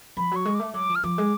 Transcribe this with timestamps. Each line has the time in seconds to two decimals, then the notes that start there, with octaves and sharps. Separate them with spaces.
0.17 F3 B5
0.31 F#3 C#6
0.45 G#3
0.54 D6
0.60 A3
0.74 F#3 D6
0.89 F3
0.95 F6
1.03 F3 D6
1.18 G#3